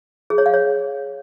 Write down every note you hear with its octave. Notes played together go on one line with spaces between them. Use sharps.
G#4
C#5
F5
C#5